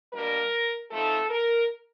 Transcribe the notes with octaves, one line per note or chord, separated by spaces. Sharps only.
B2 G3 A#3 D4 A#4
F3 A3 C4 D#4 A4
A#4